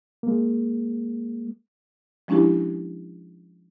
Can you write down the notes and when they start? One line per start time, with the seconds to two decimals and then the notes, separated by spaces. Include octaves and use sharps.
0.23 G#3 A#3
2.28 F3 G#3 C#4 D4 E4 G4